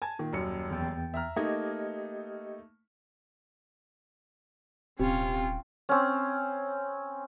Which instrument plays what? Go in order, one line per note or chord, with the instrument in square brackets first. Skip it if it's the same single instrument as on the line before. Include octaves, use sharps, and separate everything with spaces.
[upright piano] G#5 A5 G#6
A#2 D#3
D#1 F#2 C#7
[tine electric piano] E2 G5 A6
[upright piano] E5 A#5 F6
[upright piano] A3 A#3 D#4 [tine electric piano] G4 D#5 G#6
[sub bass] D#1 [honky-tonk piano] C3 [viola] C#4 F4 [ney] G5
[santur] C4 C#4